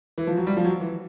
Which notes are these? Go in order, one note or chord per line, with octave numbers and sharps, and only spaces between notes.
E3
F3
F#3
G3
F3
F#3
E3